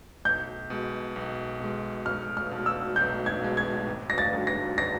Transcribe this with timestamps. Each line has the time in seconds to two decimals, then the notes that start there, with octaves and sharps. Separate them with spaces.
0.25 B1 G6
0.70 B2 G#3
1.16 B1
1.60 B2 G#3
2.06 B1 F6
2.37 F6
2.51 B2 G#3
2.66 E6
2.96 B1 G6
3.26 G#6
3.42 B2 G#3
3.57 G#6
3.87 G#1
4.10 A#6
4.18 A6
4.33 F#2 D3 G3
4.47 A#6
4.78 A#6